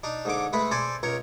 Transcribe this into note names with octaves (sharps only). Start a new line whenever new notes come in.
D4 D#4
G#2 D3 D6
G#3 A3 B4
A4 C5 D5 G#5
C#2 A#4 C#5